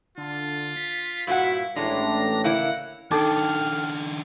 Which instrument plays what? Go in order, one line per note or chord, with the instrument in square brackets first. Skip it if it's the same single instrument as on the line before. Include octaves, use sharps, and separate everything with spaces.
[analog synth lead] D3 [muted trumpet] F4
[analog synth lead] B6
[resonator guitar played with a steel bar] G2 A#2 F#5 [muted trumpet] E4 [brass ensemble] F#4 F5
[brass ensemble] A1 A2 [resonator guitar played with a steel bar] G#3 A3 [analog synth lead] D4 [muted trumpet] A#5
[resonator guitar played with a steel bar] C#3 A#3 E4 [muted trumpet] F#5
[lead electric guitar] D#3 D4 [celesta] D#4 A4 [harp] G5 A5 D6 [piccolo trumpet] F6